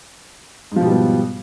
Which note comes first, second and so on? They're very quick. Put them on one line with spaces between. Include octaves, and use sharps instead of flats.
G#2 F3 B2 G3 B3